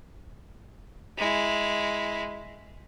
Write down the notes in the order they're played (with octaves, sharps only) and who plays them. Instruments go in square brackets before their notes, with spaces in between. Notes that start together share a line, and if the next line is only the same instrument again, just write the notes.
[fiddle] G#3 E4